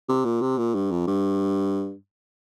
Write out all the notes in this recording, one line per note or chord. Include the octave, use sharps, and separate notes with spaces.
C3
A#2
C3
A#2
G2
F2
G2